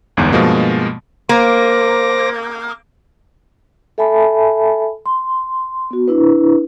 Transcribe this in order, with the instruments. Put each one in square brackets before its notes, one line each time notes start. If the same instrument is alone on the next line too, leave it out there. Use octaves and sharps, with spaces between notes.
[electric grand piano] G1 E2 G#2
G2 B2 F3 G#3 A#3
[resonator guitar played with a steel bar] A#3 [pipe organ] C5 D6 A#6
[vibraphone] A4 E5 G#5 A5 B5
C6
B3 F#4
D4 E4 B4